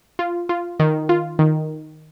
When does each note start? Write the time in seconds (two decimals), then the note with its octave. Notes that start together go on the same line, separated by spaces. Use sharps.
0.19 F4
0.49 F4
0.80 D#3
1.09 F4
1.39 D#3